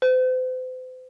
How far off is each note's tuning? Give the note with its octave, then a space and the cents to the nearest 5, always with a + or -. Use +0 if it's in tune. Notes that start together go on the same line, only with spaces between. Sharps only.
C5 -40